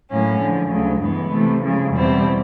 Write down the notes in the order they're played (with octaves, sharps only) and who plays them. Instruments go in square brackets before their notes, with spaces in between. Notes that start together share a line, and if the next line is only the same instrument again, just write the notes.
[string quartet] A2 F#3 A#3 C#4
D3 F3 G#3
D2 C#3 F#3
G2 E3 G#3 B3
C3 E3 A3
C#3 F3 G#3
E2 B2 G3 C4 E4